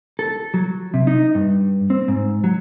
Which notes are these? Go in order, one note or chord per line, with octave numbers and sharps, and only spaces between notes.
A4
F#3
C3
D#4
G2
C4
G#2
F#3